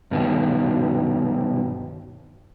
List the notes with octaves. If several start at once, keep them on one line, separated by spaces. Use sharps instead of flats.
G2 B2 D#3